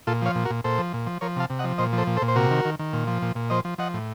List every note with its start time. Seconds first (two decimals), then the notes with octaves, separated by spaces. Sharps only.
0.07 A#2 F4 A4
0.22 F3 C#5 F5
0.35 A#2
0.45 F#4 A#4
0.50 A#2
0.64 A#2 A4 C5
0.78 F3
0.93 A#2
1.06 F3
1.21 F3 A#4 C#5
1.36 C3 F5 A5
1.50 C3
1.59 D#5 F#5
1.64 F3
1.78 A#2 C5 D#5
1.93 F3
1.98 A4 C5
2.07 A#2
2.17 A4 C5
2.22 A#2
2.28 C5
2.36 C3 F#4 A#4
2.51 D#3
2.65 D#3
2.79 D#3
2.93 A#2
3.07 F3
3.22 A#2
3.35 A#2
3.50 F3 C5 D#5
3.65 F3
3.78 F3 D#5 F#5
3.94 A2